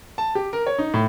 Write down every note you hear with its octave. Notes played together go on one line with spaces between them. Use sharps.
A5
G4
A#4
C#5
D#4
A2